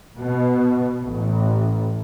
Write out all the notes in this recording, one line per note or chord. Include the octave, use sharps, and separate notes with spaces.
B2
A1